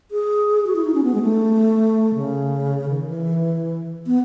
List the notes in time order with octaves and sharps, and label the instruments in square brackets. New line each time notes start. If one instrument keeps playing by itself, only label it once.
[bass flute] G#4
F#4
E4
D#4
C#4
B3
G#3
A3
C#3
D#3
E3
B3